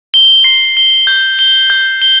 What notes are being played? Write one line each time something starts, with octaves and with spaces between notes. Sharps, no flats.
G7
C7
G7
G6
G7
G6
G7